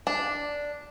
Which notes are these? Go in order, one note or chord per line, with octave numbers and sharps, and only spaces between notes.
D4